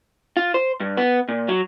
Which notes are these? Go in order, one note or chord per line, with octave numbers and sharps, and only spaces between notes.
F4
C5
G2
B3
A#2
F#3